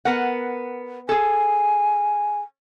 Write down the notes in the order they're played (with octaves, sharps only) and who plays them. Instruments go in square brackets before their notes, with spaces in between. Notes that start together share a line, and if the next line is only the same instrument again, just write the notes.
[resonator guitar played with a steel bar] B3 A#4 F#5
[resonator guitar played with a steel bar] G#4 A4 [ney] G#5